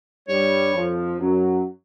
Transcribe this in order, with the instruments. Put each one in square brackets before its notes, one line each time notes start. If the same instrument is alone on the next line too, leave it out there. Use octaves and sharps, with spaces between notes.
[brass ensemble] G2 G3 [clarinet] C#5
[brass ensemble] F2 F3
F#2 F#3